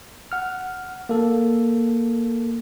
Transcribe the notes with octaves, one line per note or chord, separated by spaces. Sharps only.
F#5 F6
A#3 A4